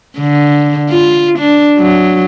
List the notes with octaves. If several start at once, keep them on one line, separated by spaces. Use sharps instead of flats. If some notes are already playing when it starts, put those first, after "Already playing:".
D3
F4
D4
F#3